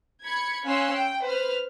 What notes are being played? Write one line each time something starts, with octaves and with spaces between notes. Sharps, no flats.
B5 G#6 C#7
C#4 F5 G#5 C6 E6 F#6
G5
B4 C5 F6